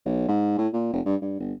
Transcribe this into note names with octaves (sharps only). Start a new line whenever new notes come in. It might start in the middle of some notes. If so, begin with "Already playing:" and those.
B1
G#2
A2
A#2
F1
G2
G2
G1